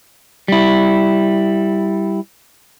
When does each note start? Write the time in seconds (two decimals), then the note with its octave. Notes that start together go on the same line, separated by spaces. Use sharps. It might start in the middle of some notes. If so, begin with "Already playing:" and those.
0.48 G3 E4